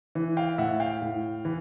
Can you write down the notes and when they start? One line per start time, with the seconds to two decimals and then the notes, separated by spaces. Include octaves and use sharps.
0.15 E3
0.37 F5 G5
0.58 A2 E5 F#5
0.80 F5 G5
1.02 A2
1.45 E3